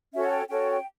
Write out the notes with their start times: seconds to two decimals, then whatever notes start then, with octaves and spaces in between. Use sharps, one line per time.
0.13 C#4 F#4 A4 C#5 E5
0.25 F#5
0.31 G5
0.49 C#4 F#4 A4 C#5 G5
0.72 G5